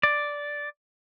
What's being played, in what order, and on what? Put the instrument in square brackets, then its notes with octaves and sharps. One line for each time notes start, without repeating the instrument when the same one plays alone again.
[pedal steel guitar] D5